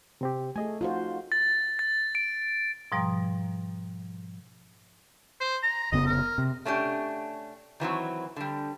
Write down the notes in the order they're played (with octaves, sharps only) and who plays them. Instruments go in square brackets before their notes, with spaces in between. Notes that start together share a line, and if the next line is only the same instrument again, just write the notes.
[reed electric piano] C3 C4 G4
[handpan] A3 [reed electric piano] G#4 D#5 G#5
[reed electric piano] D#4 [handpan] F4 F#4 C5
[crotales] A6
A6
D7
[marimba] G#2 B2 F3 G3 A#5
[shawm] C5
A#5
[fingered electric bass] F1 C#3 B3 [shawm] D#5
[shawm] A#4
[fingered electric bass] C3
[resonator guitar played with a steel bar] A3 C#4 D4 G4
D#3 E3 F#3 C4
D3 G3